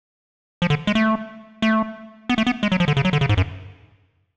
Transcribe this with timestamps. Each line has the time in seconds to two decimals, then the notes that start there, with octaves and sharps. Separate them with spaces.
0.62 F3
0.70 D3
0.87 G#3
0.95 A3
1.62 A3
2.29 B3
2.38 A3
2.47 B3
2.63 G#3
2.72 F#3
2.80 F3
2.88 D3
2.97 C#3
3.05 F#3
3.13 D3
3.21 C#3
3.29 G#2
3.37 F#2